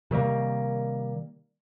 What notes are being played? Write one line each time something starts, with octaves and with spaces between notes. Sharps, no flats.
C3 D#3 G3 A#3